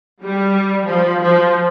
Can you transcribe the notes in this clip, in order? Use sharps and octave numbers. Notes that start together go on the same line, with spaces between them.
G3
F3
F3